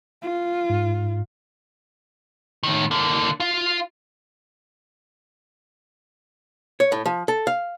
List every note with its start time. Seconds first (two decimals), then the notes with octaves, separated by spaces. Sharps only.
0.22 F4
0.70 G#2
2.63 A2 D#3
2.91 D3 A#3
3.40 F4 F5
6.80 C#5
6.92 A2
7.06 F3
7.28 A4
7.47 F5